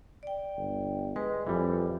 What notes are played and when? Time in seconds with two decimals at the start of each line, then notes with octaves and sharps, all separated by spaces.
0.23 D5 G5
0.57 G1
1.16 G#3 B4
1.47 F2 E3 G3